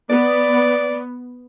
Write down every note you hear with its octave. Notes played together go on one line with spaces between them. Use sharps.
B3 D5